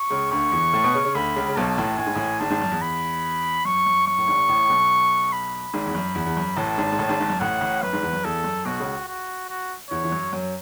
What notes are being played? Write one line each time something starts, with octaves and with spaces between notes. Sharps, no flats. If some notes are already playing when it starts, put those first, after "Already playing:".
Already playing: C#6
C#2 C#3
D2 D3 C#6
E2 E3
A2 A3
B2 B3
C#3 C#4
C#3 C#4
D2 D3 B5
C#2 C#3
C#3
B1 B2 A5
A1 A2
A2 G#5
G#2
A1 A2
G#1 G#2 A5
G#1 G#2
F#2
E2
B5
F#2 C#6
F#2
F#2 C#6
A2
G#1 G#2
A1 A2
B1 B2
B5
G#1 G#2
E2
F#2
E2
E2
F#2
A1 A2 A5
G#1 G#2
G#2
A1 A2
G#1 G#2
G#1 G#2
F#2
A1 A2 F#5
A1 A2
F#2 B4
G#1 G#2
E2
F#2
E2 A4
F#2
B1 B2 F#4
C#2 C#3
F#4
F#4
E2 E3 C#5
E3
F#2 F#3
F#2 F#3